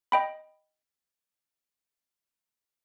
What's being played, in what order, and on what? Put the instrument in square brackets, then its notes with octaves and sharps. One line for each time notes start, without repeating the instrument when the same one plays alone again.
[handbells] D#5 G5 B5